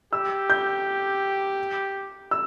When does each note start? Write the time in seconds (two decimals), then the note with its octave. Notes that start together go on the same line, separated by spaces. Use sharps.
0.13 G4 E6
0.50 G6
2.31 E6